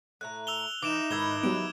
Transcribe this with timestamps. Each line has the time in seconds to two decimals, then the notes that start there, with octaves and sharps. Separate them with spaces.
0.21 A2 A3 A#5 F#6
0.47 E6 F7 G7
0.82 E3 D#4 D6 D7 E7
1.11 G#2 D#3 E4 B4 E6 G#6 G7
1.43 F#3 G3 B3 D7